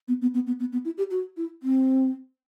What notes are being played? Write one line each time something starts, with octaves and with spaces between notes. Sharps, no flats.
B3
B3
B3
B3
B3
B3
E4
G4
F#4
E4
C4